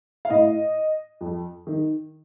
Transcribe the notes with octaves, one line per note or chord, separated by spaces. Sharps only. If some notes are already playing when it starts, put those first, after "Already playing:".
F5
A2 D#5
F2
D#3